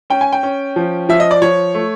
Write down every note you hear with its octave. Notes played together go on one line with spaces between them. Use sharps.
C#4 G5
G#5
G5
C#4
F3
F3 E5
D#5
D5
F3 C#5
A3